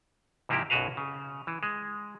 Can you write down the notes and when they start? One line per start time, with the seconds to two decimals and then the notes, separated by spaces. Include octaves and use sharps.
0.49 G#2 C3 F3 A#3 E4 G4
0.70 B1 F#2 B2 F#4 B4 F5
0.97 C#3
1.47 E3
1.63 G#3